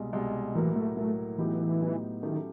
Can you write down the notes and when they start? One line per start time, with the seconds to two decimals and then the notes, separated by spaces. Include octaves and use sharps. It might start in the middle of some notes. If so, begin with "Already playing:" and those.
Already playing: C2 B2 G#3
0.13 C2 B2 G#3
0.55 A2 E3 F#3 A#3
0.76 A3
0.97 A2 F#3 A3 A#3
1.38 A2 E3 F#3 B3 D#4 G4
1.80 A2 F#3 B3 D#4 G4
2.22 D#3 F#3 A3 C#4 E4 G4